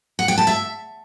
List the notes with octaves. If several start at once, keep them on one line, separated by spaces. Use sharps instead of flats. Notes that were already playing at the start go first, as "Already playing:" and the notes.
F#5
G5
A5
E5